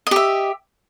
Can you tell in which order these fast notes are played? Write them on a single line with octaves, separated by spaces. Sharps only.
D#5 G4 E5